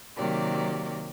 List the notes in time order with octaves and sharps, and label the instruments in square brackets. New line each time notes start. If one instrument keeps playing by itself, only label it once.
[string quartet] C3 D#3 F#3 A#3 G4 D5